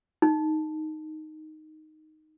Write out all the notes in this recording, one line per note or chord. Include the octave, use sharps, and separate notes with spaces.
D#4